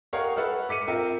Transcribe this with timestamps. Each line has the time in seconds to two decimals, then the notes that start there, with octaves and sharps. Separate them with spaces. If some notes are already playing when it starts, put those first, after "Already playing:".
0.13 G4 A#4 C#5 D#5 F5 F#5
0.36 A4 B4 E5 F#5 F6
0.69 D6 B6 C#7 D#7
0.87 C4 F4 A#4 E5 G5